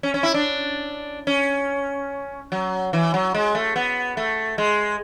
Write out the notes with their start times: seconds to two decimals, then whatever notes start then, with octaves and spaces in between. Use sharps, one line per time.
0.03 C#4
0.14 C#4
0.23 E4
0.34 D4
1.27 C#4
2.52 F#3
2.93 E3
3.14 F#3
3.34 G#3
3.55 A3
3.76 B3
4.17 A3
4.58 G#3